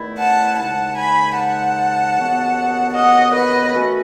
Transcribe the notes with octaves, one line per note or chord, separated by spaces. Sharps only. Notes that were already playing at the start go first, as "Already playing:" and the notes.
Already playing: E2 D#3 A3 E4
F#5 A5
D#2 C#3 G#3 D#4 F#5 A5
G#5 B5
F#5 A5
D#2 C#3 E3 B3 F#4
D#5 F#5
B4 D#5
D#3 A3 C#4 F#4